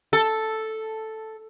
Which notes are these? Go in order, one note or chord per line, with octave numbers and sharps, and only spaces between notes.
A4